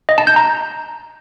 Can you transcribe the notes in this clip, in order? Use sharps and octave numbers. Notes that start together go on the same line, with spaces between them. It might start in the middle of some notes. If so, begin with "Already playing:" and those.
D#5
A5
G6
A#5